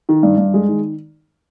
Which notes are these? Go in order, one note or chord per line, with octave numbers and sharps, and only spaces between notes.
D#3
G2
G2
G#3
D#3